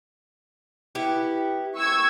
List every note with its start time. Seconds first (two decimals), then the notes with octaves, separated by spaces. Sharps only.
0.95 B3 E4 G4
1.76 C#6 E6 G#6